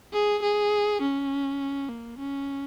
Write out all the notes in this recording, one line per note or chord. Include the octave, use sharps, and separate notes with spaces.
G#4
G#4
C#4
A#3
C#4